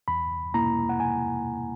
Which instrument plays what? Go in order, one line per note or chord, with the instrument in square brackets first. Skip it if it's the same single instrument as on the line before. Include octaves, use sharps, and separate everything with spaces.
[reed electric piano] E2 B5
B2 A#3 E4 A#5
F#5
G#5